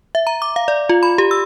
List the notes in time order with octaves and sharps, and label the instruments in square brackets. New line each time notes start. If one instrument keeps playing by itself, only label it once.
[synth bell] E5
A#5
D6
F5
D5
F4
B5
G4
E6